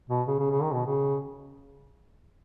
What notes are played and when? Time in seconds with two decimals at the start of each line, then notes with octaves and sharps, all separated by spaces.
0.10 B2
0.27 C#3
0.39 C#3
0.51 C#3
0.62 D#3
0.73 B2
0.86 C#3